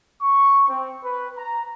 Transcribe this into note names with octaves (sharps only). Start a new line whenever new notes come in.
C#6
C4
B4
A#5